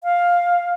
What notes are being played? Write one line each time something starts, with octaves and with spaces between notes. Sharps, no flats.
F5